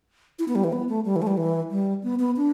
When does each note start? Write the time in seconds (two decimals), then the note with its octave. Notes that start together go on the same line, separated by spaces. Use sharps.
0.39 E4
0.48 B3
0.55 G3
0.64 E3
0.72 B3
0.89 A3
1.05 G3
1.16 E3
1.22 A3
1.27 G3
1.37 E3
1.71 G3
2.03 B3
2.19 B3
2.37 D4